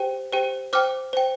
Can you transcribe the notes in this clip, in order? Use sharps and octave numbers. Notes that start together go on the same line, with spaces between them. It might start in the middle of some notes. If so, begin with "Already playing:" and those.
Already playing: G4 C5 G5
G4 C5 G5
C5 G5 D6 F6
C5 G5